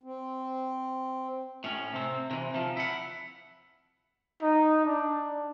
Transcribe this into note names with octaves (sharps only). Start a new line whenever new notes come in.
C4
A2 C#4
C3 C4
C3 E3
C3 F3
E4 F#5
D#4
D4